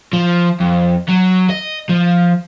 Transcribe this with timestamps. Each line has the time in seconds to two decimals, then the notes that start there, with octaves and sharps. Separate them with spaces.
0.13 F3
0.60 F2
1.08 F#3
1.50 D#5
1.89 F3